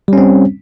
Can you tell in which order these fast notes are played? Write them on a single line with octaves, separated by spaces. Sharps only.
G3 C#4 C4